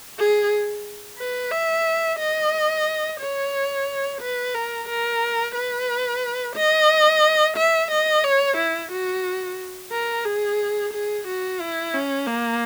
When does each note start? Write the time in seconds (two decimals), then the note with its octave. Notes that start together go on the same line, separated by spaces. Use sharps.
0.19 G#4
1.19 B4
1.52 E5
2.19 D#5
3.20 C#5
4.22 B4
4.55 A#4
4.89 A#4
5.56 B4
6.56 D#5
7.57 E5
7.91 D#5
8.24 C#5
8.57 E4
8.92 F#4
9.92 A#4
10.25 G#4
10.93 G#4
11.27 F#4
11.61 E4
11.94 C#4
12.27 A#3